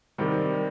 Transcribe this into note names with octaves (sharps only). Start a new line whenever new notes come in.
C3 D#3 G3